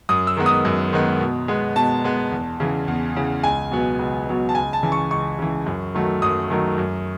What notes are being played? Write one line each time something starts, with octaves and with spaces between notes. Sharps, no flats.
F#2 D#6
E6
D#3 G#3 B3
D#6
F#2
D#3 G#3 B3
B2
G#3 B3
B2 A5
G#3 B3
E2
C#3 E3
E2
C#3 E3
C#2 G#5
B2 F#3 B3
C#2
B2 F#3 B3
A5
C#2 G#5
A5
C#3 E3
C#6
C#2 C#6
C#3 E3
F#2
D#3 F#3 A3
F#2 D#6
D#3 F#3 A3
F#2